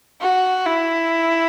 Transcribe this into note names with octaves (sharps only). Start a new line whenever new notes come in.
F#4
E4